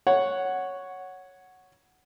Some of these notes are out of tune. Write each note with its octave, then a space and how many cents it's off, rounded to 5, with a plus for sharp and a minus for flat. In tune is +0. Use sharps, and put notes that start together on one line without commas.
C#5 +0 F#5 +0